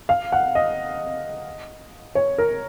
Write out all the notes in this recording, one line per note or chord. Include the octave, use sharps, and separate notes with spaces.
F5
F#5
D#5
C#5
A#4